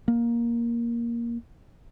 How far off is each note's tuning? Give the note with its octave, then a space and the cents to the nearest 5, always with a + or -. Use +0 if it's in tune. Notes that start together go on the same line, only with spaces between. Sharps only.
A#3 +10